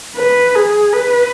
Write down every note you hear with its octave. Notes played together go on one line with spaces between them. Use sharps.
B4
G#4
B4